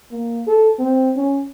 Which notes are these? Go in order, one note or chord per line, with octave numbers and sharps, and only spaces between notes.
A#3
A4
C4
C#4